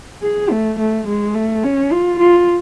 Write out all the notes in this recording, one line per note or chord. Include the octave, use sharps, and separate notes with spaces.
G#4
A3
A3
G#3
A3
C#4
F4
F4